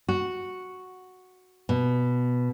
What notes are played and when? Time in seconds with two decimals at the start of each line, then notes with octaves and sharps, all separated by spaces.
0.09 F#4
1.69 B2